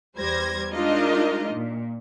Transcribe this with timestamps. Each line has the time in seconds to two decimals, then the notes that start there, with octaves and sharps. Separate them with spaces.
0.18 E2 G3 C5 G#6 A#6
0.71 G#3 D4 D#4 F4 A#4 D#5
1.53 A#2